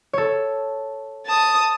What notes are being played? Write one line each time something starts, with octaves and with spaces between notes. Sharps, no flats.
A4 C#5
A5 D#6